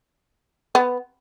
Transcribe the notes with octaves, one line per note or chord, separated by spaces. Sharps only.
B3